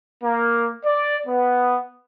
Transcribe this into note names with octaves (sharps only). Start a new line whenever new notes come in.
A#3
D5
B3